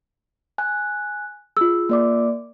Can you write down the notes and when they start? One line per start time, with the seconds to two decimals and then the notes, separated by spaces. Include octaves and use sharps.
0.58 G#5 F#6
1.57 F4 G#4 E6
1.89 A#3 D5 D6